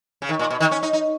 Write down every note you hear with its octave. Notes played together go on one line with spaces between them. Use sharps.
C#3
D#3
A#2
B2
D#3
C#4
D#4
D#4